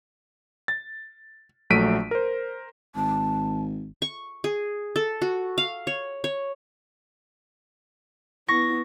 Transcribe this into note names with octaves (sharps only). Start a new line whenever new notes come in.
A6
A#1 F#3 A3 B6 D7 D#7
A#4 C5
G#1 A5
C#6
G#4
A4
F#4
F5
C#5
C#5
B3 E4 C#6 A#6